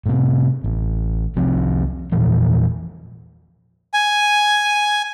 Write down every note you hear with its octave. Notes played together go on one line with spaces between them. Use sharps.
A2 C3
A1
C2 C3 F3 C4
E2 A#2 E3 F3
G#5